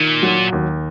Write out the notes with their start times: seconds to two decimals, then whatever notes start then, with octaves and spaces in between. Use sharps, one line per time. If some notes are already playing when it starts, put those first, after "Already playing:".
Already playing: A#2 D#3
0.23 F#3
0.52 D#2